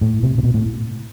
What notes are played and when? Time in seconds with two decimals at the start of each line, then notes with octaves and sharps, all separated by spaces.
0.01 A2
0.23 C3
0.38 C3
0.43 B2
0.54 A2